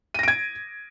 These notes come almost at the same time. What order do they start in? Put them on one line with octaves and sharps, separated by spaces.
D#7 A#6 D7 G#6